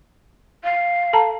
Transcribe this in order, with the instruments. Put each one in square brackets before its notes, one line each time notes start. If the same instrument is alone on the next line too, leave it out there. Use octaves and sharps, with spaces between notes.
[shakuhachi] F5
[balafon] A4 A5 A#5